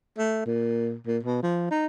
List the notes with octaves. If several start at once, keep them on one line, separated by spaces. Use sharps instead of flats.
A3
A#2
A#2
B2
F3
D#4